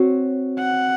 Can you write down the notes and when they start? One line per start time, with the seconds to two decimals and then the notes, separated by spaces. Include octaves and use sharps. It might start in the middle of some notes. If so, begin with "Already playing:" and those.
Already playing: C4 F#4 C#5
0.59 F#5